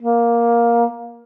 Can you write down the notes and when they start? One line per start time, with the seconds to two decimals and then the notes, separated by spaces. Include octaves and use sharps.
0.01 A#3